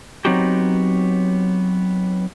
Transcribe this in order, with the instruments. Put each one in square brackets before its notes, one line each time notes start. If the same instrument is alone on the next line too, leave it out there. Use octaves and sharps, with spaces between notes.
[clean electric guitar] F#3 B3 C4 D#4 F#4 G4